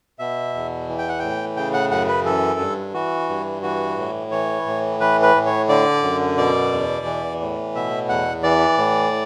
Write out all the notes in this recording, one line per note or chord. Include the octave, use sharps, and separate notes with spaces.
B2 E5
E2
E3
G5
F#5
A2 G5
C#3 G5
F#5
F#2 F#5
B4
E3 A4
G2
E3 F#4
G2
E3 F#4
A2
E3 C#5
A2
E3 B4
B4
A2
C#5
D3 D5
F#2
B2 D5
E2
E3
A2
B2 E5
E2 F#5
E3 D5
A2